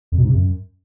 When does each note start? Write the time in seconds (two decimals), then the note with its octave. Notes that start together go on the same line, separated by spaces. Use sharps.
0.12 F2
0.17 B2
0.23 G#2
0.28 C3
0.34 F#2